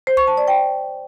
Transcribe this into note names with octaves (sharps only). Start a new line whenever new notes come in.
C5
C#6
A5
D5
G5